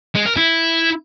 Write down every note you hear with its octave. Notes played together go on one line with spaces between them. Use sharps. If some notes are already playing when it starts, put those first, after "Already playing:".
G#3
A#4
E4